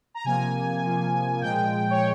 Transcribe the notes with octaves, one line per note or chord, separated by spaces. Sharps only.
A#5
C3 F3 A#3 G#5
C3 F3 A#3
A#2 F3 G#3 G5
C#5